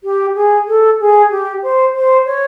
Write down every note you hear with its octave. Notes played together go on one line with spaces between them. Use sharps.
G4
G#4
A4
G#4
G4
C5
C5
C#5